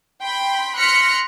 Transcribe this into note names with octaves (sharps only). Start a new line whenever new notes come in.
G5 B5 C6
C6 F6 F#6 A#6 B6 C#7